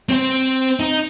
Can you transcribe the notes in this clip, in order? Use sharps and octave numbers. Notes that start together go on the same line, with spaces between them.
C4 C5
D#4